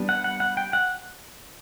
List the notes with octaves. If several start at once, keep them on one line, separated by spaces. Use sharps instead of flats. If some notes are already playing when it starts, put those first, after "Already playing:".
Already playing: G3 B3 D4
F#5
F#5
F#5
G5
F#5